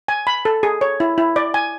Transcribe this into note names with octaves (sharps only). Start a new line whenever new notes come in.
G#5
B5
A4
G#4
C#5
E4
E4
D5
G#5